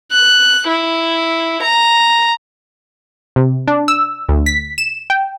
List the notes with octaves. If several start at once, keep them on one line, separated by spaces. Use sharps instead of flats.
F#6
E4
A#5
C3
D4
E6
D2
B6
E7
G5